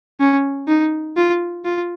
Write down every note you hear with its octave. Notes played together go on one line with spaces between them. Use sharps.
C#4
D#4
F4
F4